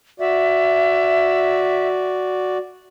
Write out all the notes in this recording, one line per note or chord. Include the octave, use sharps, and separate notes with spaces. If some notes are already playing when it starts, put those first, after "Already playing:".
F#4 D5 E5